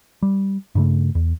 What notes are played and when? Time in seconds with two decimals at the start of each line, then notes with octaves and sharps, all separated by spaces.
0.22 G3
0.75 G2 C#3 A3
1.15 E2